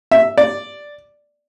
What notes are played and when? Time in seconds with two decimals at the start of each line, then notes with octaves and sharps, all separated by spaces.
0.11 E5
0.38 D5